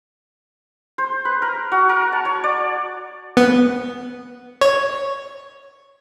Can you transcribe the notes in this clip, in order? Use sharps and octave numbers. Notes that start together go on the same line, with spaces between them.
C5
B4
A#4
F#4
A#4
A5
C#5
D5
B3
C#5